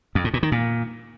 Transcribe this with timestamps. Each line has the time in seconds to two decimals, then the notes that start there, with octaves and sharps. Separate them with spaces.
0.15 F2
0.24 A2
0.34 A#2
0.43 D#3
0.52 A#2